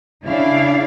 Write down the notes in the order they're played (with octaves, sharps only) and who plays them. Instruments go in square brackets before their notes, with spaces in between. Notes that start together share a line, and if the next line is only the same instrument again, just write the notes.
[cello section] C#3 D4 E4 D5 F5